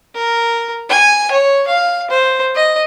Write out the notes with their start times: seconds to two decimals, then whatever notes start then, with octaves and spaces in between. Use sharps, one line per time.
0.15 A#4
0.89 G#5
1.31 C#5
1.67 F5
2.10 C5
2.55 D#5